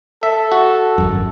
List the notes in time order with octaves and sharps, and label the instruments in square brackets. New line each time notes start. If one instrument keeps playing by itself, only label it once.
[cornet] A4 [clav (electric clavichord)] E5
[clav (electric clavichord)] F#4
[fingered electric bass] G#1 F#2